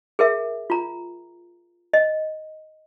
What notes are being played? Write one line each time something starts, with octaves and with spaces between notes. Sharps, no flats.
G#4 A#4 E5
F4 A#5
D#5